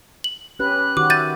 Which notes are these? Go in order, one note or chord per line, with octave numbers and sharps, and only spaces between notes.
F#7
C#4 G4 B4 F#6
D#3 F#4 G4 D6
E5 G6 A6 D#7